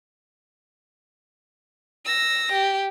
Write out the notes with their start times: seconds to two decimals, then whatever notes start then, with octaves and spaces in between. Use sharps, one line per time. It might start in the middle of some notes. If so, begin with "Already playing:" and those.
2.06 E6 A#6
2.53 G4